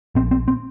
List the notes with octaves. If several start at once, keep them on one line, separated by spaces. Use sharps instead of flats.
A#1 C4
C4
C4